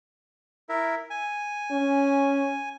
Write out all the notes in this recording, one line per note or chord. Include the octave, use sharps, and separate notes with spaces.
E4 A#4 E5
G#5
C#4